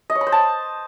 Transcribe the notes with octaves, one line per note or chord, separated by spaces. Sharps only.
D#5
C#5
B5
C5
A5